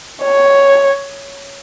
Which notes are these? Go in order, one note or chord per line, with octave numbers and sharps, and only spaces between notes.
C#5